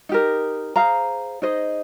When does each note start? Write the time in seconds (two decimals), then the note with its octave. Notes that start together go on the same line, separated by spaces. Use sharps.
0.09 D#4 G4 A#4
0.76 G#4 C5 F5 A#5
1.42 D#4 G#4 C5 D#5